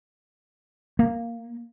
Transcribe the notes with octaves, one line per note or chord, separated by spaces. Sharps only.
A#3